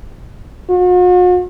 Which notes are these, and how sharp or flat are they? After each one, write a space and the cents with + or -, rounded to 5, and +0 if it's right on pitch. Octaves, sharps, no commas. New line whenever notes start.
F#4 -45